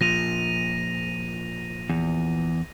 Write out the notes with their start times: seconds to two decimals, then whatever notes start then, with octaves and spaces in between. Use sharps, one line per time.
0.01 A#2 F3 A#6 D#7 F7
1.89 E2